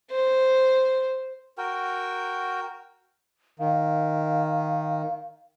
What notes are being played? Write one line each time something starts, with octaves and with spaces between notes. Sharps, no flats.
C5
F#4 A#4 G5
D#3 F5